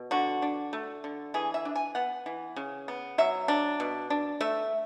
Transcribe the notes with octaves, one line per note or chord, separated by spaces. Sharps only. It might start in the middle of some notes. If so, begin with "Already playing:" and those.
Already playing: B2
D3 F#4
D4
A3
D3
E3 G#4
E5
D4
G#5
B3 F#5
E3
C#3
B3
F#3 E5
D4
B2
D4
A3 E5